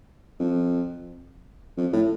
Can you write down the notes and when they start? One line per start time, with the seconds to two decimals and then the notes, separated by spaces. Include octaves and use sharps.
0.40 F2
1.77 F2
1.93 A2